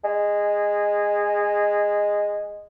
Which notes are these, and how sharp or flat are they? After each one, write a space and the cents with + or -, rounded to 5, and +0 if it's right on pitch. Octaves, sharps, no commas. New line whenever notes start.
G#3 -10